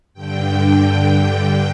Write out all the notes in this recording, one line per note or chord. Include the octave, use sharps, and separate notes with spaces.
G2 D3 G5